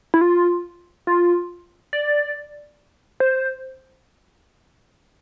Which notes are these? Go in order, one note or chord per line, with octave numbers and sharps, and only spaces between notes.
E4
F4
F4
D5
C5